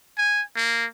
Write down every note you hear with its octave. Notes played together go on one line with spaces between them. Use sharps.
G#5
A#3